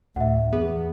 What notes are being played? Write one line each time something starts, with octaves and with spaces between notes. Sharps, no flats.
D2 A2 E5 F#5
E2 B3 G#4